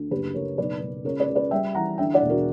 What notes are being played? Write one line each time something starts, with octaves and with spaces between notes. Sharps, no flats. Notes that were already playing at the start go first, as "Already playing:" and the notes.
Already playing: D2
F#1 G4 B4
F#1 A#4 C#5
B1 B4 D5
B1
C#2 A#4 C#5
B4 D5
C#2
B4 D5
G3 E5 G5
E3 F#5 A#5
D3 E5 G5
D5 F#5
E1
F#4 A#4